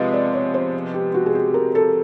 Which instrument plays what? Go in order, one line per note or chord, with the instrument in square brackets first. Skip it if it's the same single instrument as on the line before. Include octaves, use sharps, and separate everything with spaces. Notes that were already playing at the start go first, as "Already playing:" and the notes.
Already playing: [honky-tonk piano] C3 F3 G#3 B3 [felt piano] D#5 F5
[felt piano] D5
C#5
C5
G4
F#4
G#4
G4
A#4
A4